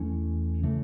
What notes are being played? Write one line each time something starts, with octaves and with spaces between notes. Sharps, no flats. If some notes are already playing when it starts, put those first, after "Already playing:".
Already playing: E2 E3 A3 C#4
C#3 E3 A3